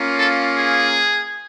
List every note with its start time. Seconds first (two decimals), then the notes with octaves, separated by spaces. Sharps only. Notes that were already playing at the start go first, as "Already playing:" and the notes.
Already playing: A#3 C#4 F4
0.18 A4
0.56 G#4